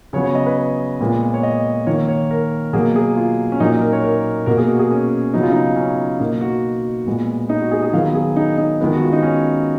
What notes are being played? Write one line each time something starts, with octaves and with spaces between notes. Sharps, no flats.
C#3 F#3 B3 C#5
C#5
D#5
B4
A#2 G#3 B3
C#5
D#5
D#3 A#3 C#5
C#5
A#4
B2 F#3 A#3 G#4
G#4
F4
C#4
A#2 F#3 A#3 D#4
D#4
A#4
C#5
A#4
B2 A#3 A#4
G#4
F#4
G#4
C#4
C#3 F#3 B3 D#4
F4
D#4
C#4
B2 A#3 D#4
F#4
A#2 G#3 B3
D#4
F#4
G#4
G#4
D#3 F#3 B3 F5
G#4
D#4
D#4
D#3 G#3 B3
F#4
F4
D#4
C#4